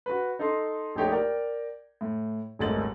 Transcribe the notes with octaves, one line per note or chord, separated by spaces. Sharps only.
F#4 B4
D#4 A4 D#5 C6
A#1 A3 D#4 G4 C#5 G5
A#4 D5 G5
A2
D#1 G#1 D2 D#5 A6 F#7